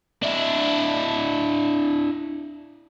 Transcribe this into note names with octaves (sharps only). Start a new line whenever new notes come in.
D4 E4